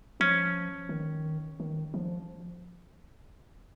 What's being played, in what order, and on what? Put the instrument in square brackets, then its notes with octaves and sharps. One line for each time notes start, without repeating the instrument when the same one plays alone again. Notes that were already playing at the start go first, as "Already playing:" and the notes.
[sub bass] F3 [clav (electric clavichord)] C#4
[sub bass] D#3
D#3
F3